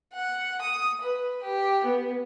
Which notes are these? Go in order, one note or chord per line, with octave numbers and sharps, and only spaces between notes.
F#5
D#6
B4
G4
B3